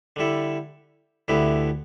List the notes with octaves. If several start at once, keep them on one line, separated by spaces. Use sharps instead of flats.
D3 G3 E4 A4
D2 D3 B3 E4 G4